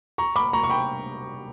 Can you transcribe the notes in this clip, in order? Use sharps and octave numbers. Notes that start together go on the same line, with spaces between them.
A#5 C#6
B5 D6
A#5 C#6
C#6
G5 B5